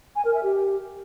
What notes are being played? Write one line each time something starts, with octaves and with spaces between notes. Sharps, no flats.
G#5
A#4
E5
G4